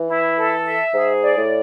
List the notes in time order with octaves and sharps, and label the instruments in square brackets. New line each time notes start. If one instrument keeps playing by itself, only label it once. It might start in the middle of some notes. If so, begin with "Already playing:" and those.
Already playing: [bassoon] E3
[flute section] E4
A4
E5
[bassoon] G#2 [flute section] G#4
[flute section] D5
[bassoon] A2